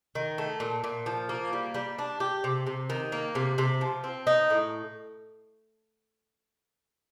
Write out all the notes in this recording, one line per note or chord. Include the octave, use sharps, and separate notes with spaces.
D#3
A3
A#2
A#2
F3
A#3
G3
G3
D4
G4
C3
C3
D#3
A#3
C3
C3
F3
C4
D#4
A2